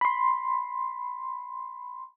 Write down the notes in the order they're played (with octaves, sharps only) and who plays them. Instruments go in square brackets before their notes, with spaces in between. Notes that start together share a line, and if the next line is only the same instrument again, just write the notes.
[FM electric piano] B5 C6